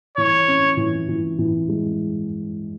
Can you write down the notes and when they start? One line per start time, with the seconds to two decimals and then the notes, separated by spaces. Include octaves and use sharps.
0.17 E3 C#5
0.48 C#4
0.77 E3
1.09 E3
1.38 E3
1.69 G#3